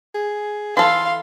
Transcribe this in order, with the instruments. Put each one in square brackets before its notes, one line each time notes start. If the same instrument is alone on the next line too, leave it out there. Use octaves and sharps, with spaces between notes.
[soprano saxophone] G#4
[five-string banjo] E3 A4 [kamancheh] F5 [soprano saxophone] C6